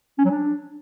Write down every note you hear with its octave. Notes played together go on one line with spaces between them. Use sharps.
C#4
F#3
D4